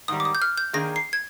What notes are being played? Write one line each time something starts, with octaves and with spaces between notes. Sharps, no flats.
G#2 D#3 G3 D#6
D6
D#6
G6
F6
G6
D#3 A#3 D4 G#4 A#6
C7
G#6